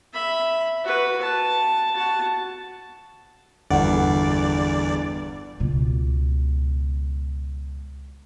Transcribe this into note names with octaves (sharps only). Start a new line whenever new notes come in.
E5 B5
F#4 B4
A5
F#4 A5
G1 E2 D5 F#5
C#2 B2